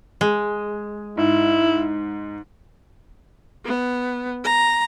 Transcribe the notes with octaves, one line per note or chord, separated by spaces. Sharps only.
G#3
G#2 E4
B3
A#5